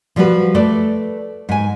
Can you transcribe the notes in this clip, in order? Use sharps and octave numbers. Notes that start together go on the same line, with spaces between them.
F3 G3 F#4 G#4 B4
A3 A4 B4 D5
G#2 G#5